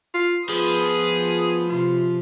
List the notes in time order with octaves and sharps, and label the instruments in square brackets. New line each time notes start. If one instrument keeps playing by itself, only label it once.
[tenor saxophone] F4
[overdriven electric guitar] F3 [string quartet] B3 B4 D#6 [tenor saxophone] G#4
[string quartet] C3 [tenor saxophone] F4